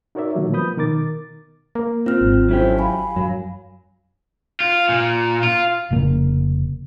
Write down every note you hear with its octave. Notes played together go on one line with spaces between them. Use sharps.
D#4 F#4 A#4 C#5 D5 E5
A#2 D3 D#3 F#3 G3 A3
F3 A#3 B3 B5 D#6 G6
B2 D#3 A#4 D6 A6
A#3
C4 F4 F6
G#1
F#3 C#4 E4 G4 A4 C5
F5 G#5 B5
F#2 F#3
F4
A#2
F4
F1 C#3 A#3